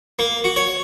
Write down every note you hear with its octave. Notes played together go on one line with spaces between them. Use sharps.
A#3
F#4
C#5